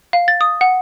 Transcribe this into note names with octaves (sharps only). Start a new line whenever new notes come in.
F5
A6
D#6
F#5